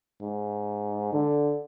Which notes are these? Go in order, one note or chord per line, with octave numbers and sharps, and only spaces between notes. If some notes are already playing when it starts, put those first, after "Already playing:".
G#2
D3